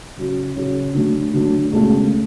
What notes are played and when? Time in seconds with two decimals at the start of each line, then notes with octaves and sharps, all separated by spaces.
0.17 C#3 F#3 C#4 F#4
0.56 C#3 F#3 C#4 F#4
0.94 D3 F#3 A3
1.34 D3 F#3 A3
1.73 C#2 B2 A3